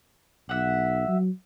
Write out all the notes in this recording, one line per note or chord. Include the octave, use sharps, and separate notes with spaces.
B1 E5 F#5
F#3